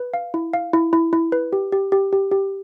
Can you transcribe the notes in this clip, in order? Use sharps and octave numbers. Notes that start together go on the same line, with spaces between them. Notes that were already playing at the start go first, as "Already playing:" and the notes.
Already playing: B4
F5
E4
F5
E4
E4
E4
B4
G4
G4
G4
G4
G4